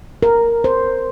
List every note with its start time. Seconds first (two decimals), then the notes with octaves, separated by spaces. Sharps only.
0.23 A#4
0.64 C5